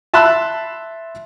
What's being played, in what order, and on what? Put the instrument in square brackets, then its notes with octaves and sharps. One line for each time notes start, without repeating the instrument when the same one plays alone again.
[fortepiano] E5 A5 B5 C6 E6 F#6